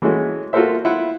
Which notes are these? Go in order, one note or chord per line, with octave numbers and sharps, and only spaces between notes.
E3 G#3 A3 C#4 F#4
F4 F#4 A4 A#4 C5 E5
E4 F4 F#5